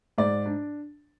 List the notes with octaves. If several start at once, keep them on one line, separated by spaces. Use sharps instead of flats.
G#2 D5
D4